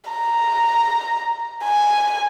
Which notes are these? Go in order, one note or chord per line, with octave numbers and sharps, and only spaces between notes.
A#5
G#5